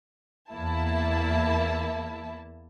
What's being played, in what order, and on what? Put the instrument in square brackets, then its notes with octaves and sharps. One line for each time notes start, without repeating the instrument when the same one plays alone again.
[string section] E2 A#3 E4 A5